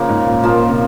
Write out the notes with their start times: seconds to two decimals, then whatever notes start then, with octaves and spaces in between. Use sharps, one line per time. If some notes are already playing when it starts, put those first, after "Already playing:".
Already playing: C#3 F3 A#3
0.09 G#2
0.26 A#2
0.43 A#2 F3 A#3 F4
0.69 C3